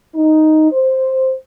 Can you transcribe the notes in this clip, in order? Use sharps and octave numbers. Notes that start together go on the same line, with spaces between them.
D#4
C5